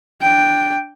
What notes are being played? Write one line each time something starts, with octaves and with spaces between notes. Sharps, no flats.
D4 G5